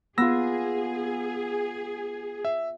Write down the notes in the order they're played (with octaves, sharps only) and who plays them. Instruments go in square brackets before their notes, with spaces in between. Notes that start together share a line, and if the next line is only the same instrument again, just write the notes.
[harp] B3 F4 [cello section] G#4 [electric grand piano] E6 A#6
[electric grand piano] E5